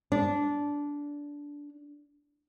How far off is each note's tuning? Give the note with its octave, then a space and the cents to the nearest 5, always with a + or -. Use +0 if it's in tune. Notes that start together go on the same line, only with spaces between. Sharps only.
D4 -15